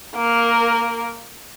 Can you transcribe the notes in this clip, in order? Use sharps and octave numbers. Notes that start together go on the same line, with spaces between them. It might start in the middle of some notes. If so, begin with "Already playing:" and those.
A#3 A#4